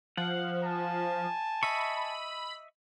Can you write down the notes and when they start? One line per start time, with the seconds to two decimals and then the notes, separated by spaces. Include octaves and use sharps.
0.17 F3 F#5
0.64 G#5 A5
1.63 D#5 E5 B5 C#6